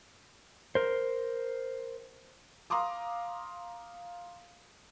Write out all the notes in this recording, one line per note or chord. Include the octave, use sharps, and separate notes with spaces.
A#4 C5
F5 A#5 C6 D6 D#6